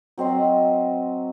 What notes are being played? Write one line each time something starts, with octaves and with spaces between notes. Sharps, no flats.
F#3 C4 D#5 C6